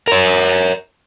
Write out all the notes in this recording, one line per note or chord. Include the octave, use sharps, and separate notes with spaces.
A#4 C#5